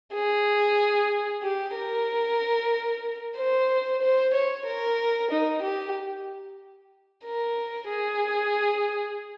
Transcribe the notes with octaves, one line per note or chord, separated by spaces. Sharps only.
G#4
G4
A#4
C5
C5
C#5
A#4
D#4
G4
A#4
G#4